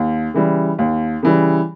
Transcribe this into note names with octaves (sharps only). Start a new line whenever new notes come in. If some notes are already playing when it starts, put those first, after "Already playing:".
Already playing: D#2
C#3 E3 G3
D#2
C#3 E3 G3